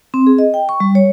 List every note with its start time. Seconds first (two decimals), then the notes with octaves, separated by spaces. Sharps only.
0.14 C4
0.27 G#4
0.39 D#5
0.54 G5
0.69 C#6
0.80 G3
0.95 C#5